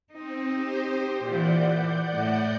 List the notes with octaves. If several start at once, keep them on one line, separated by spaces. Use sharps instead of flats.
C4 D#4
G4 C5
A#2 E3 D5 F#5 G6
A2